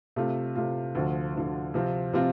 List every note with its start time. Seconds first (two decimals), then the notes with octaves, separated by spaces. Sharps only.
0.16 C3 A3 F4
0.55 C3 A3 F4
0.95 D2 D3 F3
1.34 D2 D3 F3
1.74 C3 F3 C4 F4
2.13 C3 F3 C4 F4